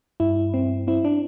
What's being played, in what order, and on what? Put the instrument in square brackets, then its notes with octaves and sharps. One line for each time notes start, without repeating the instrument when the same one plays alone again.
[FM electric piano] G2 E4
C4
C4 E4
D4